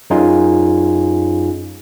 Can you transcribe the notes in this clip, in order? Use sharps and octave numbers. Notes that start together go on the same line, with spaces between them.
F#2 C#4 D#4 F4 G#4 G#5